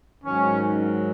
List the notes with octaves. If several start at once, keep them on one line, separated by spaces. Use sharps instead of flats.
G#2 D#3 F#3 C#4